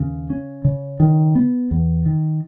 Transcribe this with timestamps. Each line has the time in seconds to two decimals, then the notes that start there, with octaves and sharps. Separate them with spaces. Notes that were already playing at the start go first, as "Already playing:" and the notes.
Already playing: D#2 C#3
0.30 C#4
0.65 C#3
1.00 D#3
1.35 B3
1.71 E2
2.06 D#3